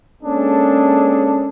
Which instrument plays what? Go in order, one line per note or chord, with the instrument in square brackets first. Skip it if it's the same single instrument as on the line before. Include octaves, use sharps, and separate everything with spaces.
[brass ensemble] G#3 A#3 C#4 D4 G#4 A4